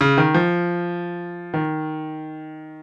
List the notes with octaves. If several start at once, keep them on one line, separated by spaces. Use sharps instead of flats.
C#3
D#3
F3
D#3